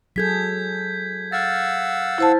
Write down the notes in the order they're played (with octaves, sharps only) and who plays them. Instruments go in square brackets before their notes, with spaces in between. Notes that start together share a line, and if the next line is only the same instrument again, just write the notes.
[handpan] F#3 G#4 A4 [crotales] G6 G#6 B6
[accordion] F5 F#5 E6 [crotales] F6 A6
[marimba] E4 C5 A5